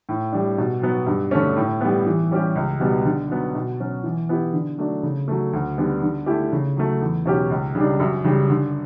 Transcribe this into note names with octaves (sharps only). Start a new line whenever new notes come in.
A2
G3 D4
B2
F#3 B3
G2
D3 A3 C#4
A2
G3 B3
E3
G3 C#4 G4
C#2
B2 G3 B3
D3
F#3 B3
B2
F#3 C#4
E3
B3 E4 G4
D3
F#3 A3 D4
C#3
F#3 A3
D2
D3 G3 B3
D3
A3 E4 G4
C#3
F#3 A3
E2
B2 F#3 C#4 G4
C#2
C#3 G3 D4
F#2
C#3 G3
D3